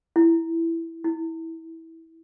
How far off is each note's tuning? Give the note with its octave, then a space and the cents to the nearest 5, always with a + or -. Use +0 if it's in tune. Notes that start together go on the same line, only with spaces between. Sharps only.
E4 +5
E4 -20